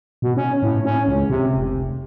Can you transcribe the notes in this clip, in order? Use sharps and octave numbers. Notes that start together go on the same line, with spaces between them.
B2
C#4
A2
C#4
C#2
C3
F1